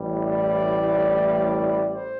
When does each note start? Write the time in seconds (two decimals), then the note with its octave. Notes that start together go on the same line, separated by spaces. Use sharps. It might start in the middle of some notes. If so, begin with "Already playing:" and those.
Already playing: A1 A2 G3
0.19 D5
1.89 C5